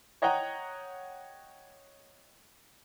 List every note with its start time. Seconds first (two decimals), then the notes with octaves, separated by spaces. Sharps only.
0.22 C#5 D#5 F#5 G5 A#5